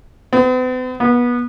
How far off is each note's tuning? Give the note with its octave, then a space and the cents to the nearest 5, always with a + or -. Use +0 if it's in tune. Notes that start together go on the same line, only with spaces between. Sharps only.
B3 +45
B3 -25